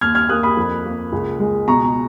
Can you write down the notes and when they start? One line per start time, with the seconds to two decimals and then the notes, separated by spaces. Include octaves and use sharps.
0.01 D#2 F6 G#6
0.15 F6 G#6
0.29 A#3 D#6 F#6
0.43 B5 D#6
0.57 F2
0.85 A#3
1.12 C#2
1.39 G#3
1.67 B2 A#5 C#6